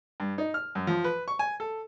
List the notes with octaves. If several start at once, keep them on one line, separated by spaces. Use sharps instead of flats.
G2
D#4
F6
F#2
F3
B4
C#6
G#5
A4